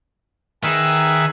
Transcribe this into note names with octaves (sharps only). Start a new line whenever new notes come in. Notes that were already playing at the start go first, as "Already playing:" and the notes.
D#3 G#4 B4 E5